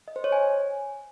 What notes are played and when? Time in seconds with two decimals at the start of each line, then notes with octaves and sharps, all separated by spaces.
0.08 D#5
0.16 C5
0.24 C#5
0.32 G#5